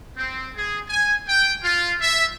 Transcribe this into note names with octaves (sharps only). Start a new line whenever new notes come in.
C4
G#4
G#5
G5
F4
E5